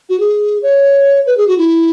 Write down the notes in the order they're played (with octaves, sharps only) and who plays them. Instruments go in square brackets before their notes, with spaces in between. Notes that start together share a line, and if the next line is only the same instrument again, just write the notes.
[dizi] F#4
G#4
C#5
B4
G#4
F#4
E4